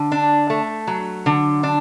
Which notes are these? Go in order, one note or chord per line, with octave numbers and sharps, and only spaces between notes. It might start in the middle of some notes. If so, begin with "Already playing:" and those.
Already playing: D3
D4
A3
F#3
D3
D4